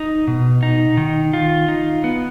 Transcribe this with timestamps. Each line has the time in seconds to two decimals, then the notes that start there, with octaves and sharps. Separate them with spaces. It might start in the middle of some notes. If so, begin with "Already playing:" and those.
Already playing: D#4
0.28 B2
0.63 D#4
0.97 D#3
1.33 F4
1.68 D#4
2.04 B3